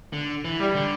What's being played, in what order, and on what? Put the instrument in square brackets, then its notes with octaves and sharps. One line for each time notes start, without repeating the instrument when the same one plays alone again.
[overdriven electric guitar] D3
E3
[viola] G3
[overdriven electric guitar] D3